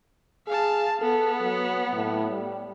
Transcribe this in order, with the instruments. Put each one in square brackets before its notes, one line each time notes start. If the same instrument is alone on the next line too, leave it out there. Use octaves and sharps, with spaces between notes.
[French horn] G#4 [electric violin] F5 A5
[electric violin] B3 [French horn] A4
[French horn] F#3
A2
G3